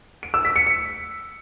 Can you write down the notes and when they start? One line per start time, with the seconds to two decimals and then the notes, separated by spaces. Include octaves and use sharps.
0.23 D7
0.34 E6
0.45 B6
0.56 C#7
0.67 C#7